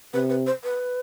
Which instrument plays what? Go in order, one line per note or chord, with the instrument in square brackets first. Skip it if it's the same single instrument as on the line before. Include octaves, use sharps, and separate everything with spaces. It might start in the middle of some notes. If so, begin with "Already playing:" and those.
[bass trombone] C3 [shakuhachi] B4
[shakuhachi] B4
C5
B4